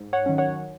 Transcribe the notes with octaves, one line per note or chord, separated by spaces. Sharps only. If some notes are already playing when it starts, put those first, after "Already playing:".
Already playing: G#2
C#5 F#5
D#3 F#3 C#4
C#5 F#5